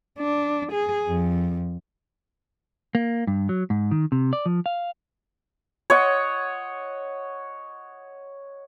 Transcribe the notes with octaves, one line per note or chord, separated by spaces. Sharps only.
D4
G#4
F2
A#3
G2
F#3
G#2
D#3
C3
D5
F3
F5
C#5 D#5 F#5